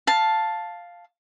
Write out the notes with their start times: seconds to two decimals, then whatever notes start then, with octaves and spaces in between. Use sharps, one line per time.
0.07 F5 A5